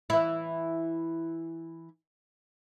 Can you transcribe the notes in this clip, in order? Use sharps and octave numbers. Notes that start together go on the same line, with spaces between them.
E3 E4